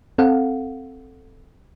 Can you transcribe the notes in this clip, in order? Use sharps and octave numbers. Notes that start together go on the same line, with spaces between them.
C4 A4 F5 F#5